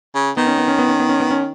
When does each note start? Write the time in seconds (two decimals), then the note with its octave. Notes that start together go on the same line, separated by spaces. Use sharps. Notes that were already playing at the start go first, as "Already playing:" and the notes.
0.15 C#3
0.37 D#3 B3
0.47 C#4
0.58 B3
0.68 C#4
0.79 B3
0.89 C#4
1.00 B3
1.09 C#4
1.20 B3
1.31 C#4